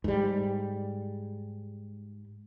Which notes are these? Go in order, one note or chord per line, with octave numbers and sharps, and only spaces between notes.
G#2 G3